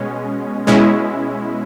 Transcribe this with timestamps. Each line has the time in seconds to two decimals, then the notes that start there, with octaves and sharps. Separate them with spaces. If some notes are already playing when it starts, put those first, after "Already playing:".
Already playing: B2 G#3 C#4
0.67 B2 G#3 C#4 E4